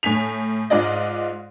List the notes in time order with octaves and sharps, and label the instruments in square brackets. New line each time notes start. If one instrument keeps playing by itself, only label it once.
[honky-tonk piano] A2 G#5 B6 F7
G#2 F4 D5 D#5